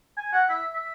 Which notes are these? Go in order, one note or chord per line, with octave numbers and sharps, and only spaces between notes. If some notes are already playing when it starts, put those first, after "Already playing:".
G#5
F#5
E5
E5